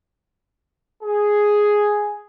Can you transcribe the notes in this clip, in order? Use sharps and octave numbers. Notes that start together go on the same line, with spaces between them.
G#4